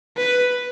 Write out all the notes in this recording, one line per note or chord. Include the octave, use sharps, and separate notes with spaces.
B4